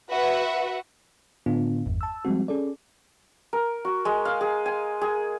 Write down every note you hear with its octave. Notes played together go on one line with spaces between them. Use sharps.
F#4 B4 E5 F#5
A2 D3 B3 D4 F4
G1 E2 G2
A5 E6
F3 G3 G#3 C4 F#4
C#4 G#4 A4 D5
A#4
F#4
G#3
F5
G#4
G#5
G#4